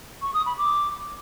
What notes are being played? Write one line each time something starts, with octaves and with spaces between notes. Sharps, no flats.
C#6
D#6
B5
D6